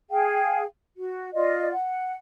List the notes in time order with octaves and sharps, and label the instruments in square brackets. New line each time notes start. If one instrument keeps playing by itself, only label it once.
[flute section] G#4 F5 G5
F#4
F4 D5 D#5
F#5